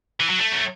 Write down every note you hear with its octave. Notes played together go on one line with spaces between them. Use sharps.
E3
F#3
A3
F#3